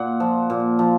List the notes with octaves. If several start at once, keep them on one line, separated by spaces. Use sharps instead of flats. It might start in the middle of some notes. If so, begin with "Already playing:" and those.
Already playing: A#2 F#5
F3
A#2
F3